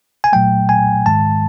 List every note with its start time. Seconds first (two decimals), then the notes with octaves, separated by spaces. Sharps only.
0.24 G#5
0.33 A#2 F#3 A3 G5
0.69 G#5
1.06 G#2 D#3 G#3 A5